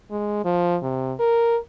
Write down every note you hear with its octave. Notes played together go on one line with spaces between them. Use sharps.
G#3
F3
C3
A#4